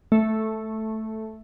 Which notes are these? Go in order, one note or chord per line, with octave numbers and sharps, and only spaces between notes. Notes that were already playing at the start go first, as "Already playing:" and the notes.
A3